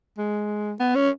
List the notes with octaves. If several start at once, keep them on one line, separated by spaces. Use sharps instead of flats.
G#3
B3
C#4